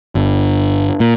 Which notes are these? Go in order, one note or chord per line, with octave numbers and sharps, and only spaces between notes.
G1
A#2